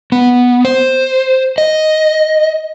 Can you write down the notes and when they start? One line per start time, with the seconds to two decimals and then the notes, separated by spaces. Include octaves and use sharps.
0.12 B3
0.65 C5
1.58 D#5